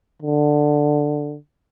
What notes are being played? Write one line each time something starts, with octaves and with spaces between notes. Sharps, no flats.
D3